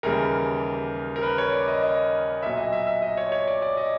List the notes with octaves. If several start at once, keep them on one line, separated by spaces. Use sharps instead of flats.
D#2 C#3 E3 G3 A#4
A#4
B4
C#5
D5
D#5
D#5
B1 A#2 F#3 E5
D#5
E5
E5
D#5
C#5
C#5
D5
D5
D#5